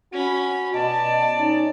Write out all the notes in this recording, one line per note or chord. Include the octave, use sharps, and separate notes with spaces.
C#4 F#4 B5
B2 D5 D#5 A5
C#4 D#4